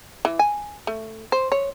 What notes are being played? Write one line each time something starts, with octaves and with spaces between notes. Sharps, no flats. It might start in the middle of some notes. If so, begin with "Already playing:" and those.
E3
G#5
A3
C5
C#5